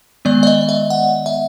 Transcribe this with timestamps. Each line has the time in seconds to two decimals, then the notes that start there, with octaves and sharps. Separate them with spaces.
0.25 D#3 G#3 B3 D5
0.43 D5
0.47 D#5
0.69 E5
0.90 F#5
1.26 E5